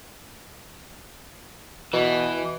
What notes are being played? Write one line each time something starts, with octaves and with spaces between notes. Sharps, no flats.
B2 E3